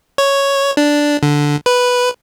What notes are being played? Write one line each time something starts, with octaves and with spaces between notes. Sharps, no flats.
C#5
D4
D3
B4